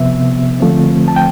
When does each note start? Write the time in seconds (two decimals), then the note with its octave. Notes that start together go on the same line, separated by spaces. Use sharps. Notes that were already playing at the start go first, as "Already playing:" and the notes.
Already playing: C3 F3 B3 E5
0.60 D3 F3 A3 C4
1.08 A5
1.16 G5